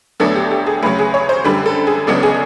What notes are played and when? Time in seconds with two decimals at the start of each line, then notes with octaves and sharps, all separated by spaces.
0.20 D2 D3 F#3 B3 D4 A4
0.35 G4
0.51 G4
0.66 G#4
0.82 D2 C#3 F#3 B4
0.99 G#4
1.14 C#5
1.29 C5
1.44 F#2 D3 G3 B4
1.66 A4
1.87 G#4
2.07 C#2 C#3 F#3 B3 D4 A4
2.23 G#4